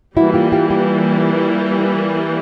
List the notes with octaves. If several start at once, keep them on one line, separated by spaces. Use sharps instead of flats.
E3 G3 A#3 E4 F#4
F4 G4
F4 G4
F4 G4